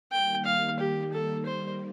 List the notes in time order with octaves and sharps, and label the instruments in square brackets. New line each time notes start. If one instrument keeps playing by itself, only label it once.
[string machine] D#3 G3 A#3 [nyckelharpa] G5
[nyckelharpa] F5
G4
A4
C5